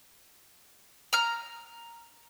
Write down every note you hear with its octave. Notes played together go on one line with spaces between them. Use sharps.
A#5 F6